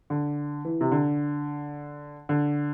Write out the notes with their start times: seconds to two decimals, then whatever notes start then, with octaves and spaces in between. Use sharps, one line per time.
0.10 D3
0.65 E3
0.81 C3
0.92 D3
2.29 D3